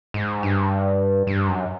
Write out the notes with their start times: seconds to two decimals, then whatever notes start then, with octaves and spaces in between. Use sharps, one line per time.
0.14 G#2
0.43 G2
1.27 G2
1.48 F#2